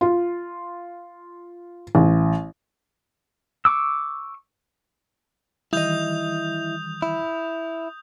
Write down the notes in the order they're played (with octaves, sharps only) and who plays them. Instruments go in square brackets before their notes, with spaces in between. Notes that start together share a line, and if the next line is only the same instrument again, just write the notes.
[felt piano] F4
A1
[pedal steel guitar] C#6 D6 E6
[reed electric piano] D#3 E3 G3 [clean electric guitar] E4 D#5 [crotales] D#6 G6 F7
[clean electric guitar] E4